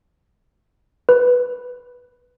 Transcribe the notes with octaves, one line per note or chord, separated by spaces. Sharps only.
B4